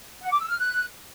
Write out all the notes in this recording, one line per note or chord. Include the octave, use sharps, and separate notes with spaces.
F#5
D6
E6
F6
F#6